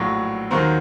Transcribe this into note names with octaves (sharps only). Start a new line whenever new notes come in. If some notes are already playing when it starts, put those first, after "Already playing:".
Already playing: A#1 A2 F#3
D#2 D#3 F#3 A#4 C5